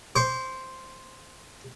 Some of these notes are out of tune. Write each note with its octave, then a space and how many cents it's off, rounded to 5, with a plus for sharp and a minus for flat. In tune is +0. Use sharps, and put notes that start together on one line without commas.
C5 +0 D6 -45